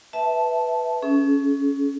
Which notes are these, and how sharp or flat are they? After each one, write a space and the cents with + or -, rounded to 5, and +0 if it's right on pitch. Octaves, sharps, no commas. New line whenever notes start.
B4 +0 E5 -10 A5 -5
C#4 +10 G#4 +40